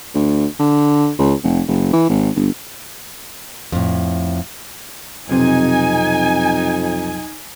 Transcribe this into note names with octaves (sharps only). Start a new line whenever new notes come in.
D2
D3
C#2
F1
F#1
E3
G#1
G1
F2 A2
B1 F2 C3 D#4 G#5